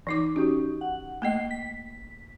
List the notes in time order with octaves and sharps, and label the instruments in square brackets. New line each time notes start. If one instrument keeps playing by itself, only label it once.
[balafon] E3 D#4 D6
[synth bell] C#4 D#4 G4 [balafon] F#4
[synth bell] F#5
[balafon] A3 A#3 D#5 [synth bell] G5 C7
[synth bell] B6